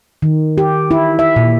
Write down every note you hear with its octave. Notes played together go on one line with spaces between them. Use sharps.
D#3
G4
E4
E5
A#2